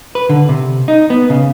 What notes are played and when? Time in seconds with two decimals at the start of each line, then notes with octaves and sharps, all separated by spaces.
0.15 B4
0.29 D3
0.49 C3
0.88 D#4
1.10 B3
1.30 C#3